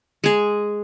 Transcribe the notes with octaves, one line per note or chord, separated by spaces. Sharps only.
G#3 G#4